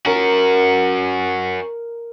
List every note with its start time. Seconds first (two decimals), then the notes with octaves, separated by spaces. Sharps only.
0.06 C#4 F#4 A#4